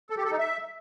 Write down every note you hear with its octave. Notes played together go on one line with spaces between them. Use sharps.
A4
G4
A4
D#4
E5